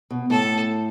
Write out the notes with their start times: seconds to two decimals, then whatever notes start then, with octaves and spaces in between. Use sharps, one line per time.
0.11 B2
0.30 A2 A4